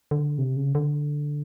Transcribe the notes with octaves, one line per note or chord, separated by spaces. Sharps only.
D3
C3
C#3
D3